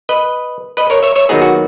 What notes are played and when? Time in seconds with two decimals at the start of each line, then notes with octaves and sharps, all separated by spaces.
0.09 B4 D#5
0.77 B4 D#5
0.90 A#4 C#5
1.03 C#5 E5
1.15 C#5 E5
1.29 D#2 D#3 F#3 B3 D#4 G#4
1.42 F#4